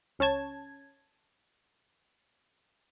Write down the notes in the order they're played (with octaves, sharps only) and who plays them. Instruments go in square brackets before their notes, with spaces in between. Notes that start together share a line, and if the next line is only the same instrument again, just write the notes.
[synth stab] C#2 C#4 C#5 A5 G#6